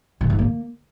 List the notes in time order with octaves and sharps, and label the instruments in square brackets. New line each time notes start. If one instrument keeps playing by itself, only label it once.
[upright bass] A#2
G#2
A#3